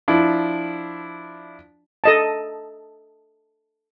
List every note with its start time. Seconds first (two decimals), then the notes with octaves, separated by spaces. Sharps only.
0.08 F3 D4 E4
2.04 A4 D#5 A5